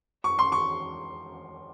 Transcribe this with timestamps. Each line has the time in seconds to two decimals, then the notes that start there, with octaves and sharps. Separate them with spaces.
0.24 C#6
0.39 C6
0.52 C#6